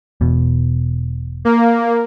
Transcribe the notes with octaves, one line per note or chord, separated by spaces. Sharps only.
E1 B2
A#3